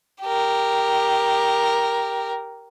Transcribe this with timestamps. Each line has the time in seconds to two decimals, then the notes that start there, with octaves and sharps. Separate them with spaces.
0.23 G4 A#4